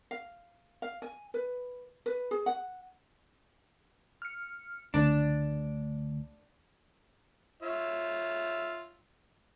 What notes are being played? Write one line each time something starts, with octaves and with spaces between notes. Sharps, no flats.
F5
F5
G#5
B4
B4
G#4
F#5
F6 C#7
C#2 D3 A3 D4
F4 C#5 E5